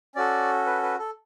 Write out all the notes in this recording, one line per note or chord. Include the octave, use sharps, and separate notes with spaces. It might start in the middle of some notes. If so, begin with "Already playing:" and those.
C#4 F#4 A4 D5
B4
B4
A4